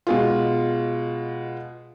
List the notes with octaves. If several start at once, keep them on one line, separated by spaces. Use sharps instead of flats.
B2 G#3 F4